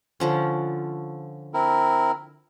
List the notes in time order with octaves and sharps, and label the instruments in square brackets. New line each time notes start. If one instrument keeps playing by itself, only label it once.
[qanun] D3 F3 C#4
[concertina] C4 E4 A#4